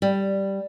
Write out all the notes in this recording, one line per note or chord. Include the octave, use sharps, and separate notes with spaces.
G3